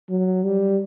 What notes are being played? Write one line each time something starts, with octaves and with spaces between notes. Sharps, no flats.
F#3
G3